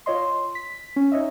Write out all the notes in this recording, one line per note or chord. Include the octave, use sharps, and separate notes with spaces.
F4 C#5 D#5 C6
C6
B6
C#4
D#4 C#5 D#5 E5